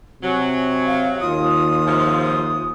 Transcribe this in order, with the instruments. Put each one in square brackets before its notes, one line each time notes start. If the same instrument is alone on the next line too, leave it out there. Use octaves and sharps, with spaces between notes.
[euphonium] C3 [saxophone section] F#3 [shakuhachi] G#5
[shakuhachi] F5
[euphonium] D#2 [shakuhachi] F4 [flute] D#6
[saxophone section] G#2 C3 F3